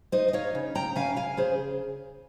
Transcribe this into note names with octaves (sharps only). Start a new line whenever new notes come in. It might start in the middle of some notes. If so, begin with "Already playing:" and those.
D#4 C5 D#5
D#5
D#4 C#5 F5
C#3
C#3 G5 A#5
C#3 F5 G#5
C#3 F5 G#5
C#3 G#4 C5